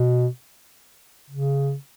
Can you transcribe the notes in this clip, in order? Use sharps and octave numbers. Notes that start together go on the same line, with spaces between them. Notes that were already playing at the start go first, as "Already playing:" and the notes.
Already playing: B2
C#3